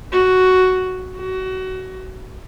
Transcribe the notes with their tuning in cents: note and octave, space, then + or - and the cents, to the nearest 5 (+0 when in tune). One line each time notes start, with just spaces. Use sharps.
F#4 +5
F#4 +25